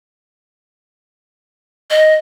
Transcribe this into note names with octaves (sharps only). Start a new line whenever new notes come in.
D#5